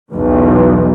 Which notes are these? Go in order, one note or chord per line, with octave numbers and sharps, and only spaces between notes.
B1 E2